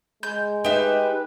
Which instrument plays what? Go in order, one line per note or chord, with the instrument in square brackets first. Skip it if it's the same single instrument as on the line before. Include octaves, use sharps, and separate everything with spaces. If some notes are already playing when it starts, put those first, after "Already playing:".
[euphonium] G#3 [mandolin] G6
[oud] D#4 E5 [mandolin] G4 [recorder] B4